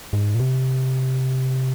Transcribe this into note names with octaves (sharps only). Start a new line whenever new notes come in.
G#2
A#2
C3